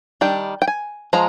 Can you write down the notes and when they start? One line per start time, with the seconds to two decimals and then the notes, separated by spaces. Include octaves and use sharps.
0.21 D#3 G3 D4 G5
0.62 G5
0.68 G#5
1.13 F3 G#3 A#5